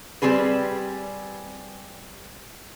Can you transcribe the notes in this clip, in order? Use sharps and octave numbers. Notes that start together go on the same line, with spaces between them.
G3 C4 G4 G#4 B4